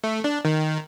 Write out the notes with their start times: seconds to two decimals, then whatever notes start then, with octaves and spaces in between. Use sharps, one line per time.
0.04 A3
0.24 D4
0.45 D#3